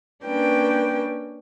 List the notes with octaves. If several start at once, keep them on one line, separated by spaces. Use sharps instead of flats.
A#3 C#4 D4 B4 G5